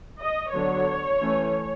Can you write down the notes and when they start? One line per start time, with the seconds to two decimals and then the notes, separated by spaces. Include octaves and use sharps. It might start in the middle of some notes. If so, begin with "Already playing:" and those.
0.21 D#5
0.54 D3 F#3 B3 D4 C#5
1.21 E3 A3 C#4